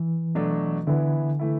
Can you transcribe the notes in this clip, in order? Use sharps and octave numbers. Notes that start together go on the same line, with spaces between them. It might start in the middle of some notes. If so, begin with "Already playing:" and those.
Already playing: E3
B2 F#3 A3 D4
D3 E3 B3 E4
E3 A3 E4